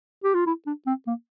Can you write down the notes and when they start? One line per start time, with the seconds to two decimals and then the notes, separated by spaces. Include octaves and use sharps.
0.24 G4
0.34 F4
0.46 E4
0.67 D4
0.87 C4
1.07 A#3